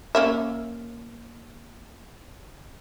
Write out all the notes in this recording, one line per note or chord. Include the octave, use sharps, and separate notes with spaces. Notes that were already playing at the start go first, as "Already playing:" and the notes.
A#3 C#4 E5